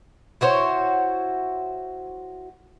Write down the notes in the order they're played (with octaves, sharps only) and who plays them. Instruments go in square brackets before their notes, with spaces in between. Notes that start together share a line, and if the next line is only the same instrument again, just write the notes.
[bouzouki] E4 F#4 C5 C#5